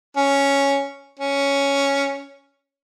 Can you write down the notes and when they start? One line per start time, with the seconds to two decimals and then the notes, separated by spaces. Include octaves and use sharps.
0.16 C#4
1.19 C#4